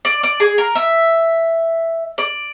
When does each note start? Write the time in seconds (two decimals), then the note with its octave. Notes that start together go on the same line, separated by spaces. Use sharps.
0.05 D5
0.23 D5
0.40 G#4
0.58 A#4
0.75 E5
2.18 D5